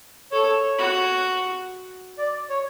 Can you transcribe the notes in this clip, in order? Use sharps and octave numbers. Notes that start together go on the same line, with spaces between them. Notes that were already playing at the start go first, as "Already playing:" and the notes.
A4 C#5
F#4
D5
C#5